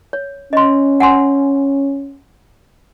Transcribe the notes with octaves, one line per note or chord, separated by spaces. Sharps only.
C#5
C#4 D#5 C6
F#5 G#5 C6